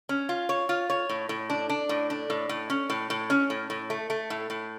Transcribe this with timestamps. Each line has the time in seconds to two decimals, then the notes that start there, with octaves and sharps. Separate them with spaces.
0.09 C#4
0.29 F4
0.49 C#5
0.69 F4
0.90 C#5
1.09 A2
1.29 A2
1.50 D4
1.69 D4
1.89 A2
2.10 D4
2.30 A2
2.49 A2
2.70 C#4
2.90 A2
3.10 A2
3.30 C#4
3.50 A2
3.70 A2
3.90 A3
4.10 A3
4.30 A2
4.50 A2